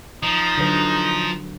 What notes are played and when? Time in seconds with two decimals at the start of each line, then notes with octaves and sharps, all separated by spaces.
0.23 F3 D#4
0.58 D3 F#3 B4